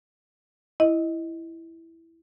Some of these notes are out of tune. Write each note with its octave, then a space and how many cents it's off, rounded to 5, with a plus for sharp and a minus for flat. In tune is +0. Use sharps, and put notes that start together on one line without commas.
E4 +0 D#5 +10